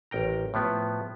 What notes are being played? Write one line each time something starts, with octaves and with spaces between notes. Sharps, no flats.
A1 A#4 G5 A#5
A2 F3 B3